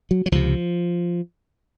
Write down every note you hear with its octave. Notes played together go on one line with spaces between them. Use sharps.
F#3
F#3
C#2 C3 F3